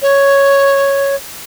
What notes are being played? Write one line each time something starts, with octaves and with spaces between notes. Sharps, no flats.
C#5